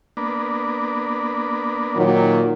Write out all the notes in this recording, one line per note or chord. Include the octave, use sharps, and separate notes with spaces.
A#3 B3 D4
A#2 D#3 F#3